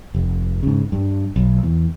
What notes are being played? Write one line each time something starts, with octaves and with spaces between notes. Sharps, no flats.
F1
G#2 C#3
G2
B1
E2